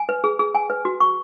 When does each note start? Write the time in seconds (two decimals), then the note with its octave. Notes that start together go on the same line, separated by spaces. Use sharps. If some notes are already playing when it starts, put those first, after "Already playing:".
Already playing: G#5
0.09 B4
0.24 G#4
0.39 G#4
0.55 G#5
0.70 B4
0.85 F#4
1.00 C#6